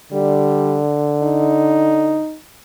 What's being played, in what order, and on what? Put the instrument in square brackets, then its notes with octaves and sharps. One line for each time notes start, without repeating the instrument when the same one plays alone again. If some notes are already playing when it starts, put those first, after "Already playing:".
[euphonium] D3 [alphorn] G3
[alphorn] D#4